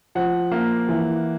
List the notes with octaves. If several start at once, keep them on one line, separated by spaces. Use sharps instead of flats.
F3 F#5
A#3
E3